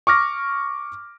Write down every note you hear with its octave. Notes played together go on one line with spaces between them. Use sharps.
C#6 D6 F6 A#6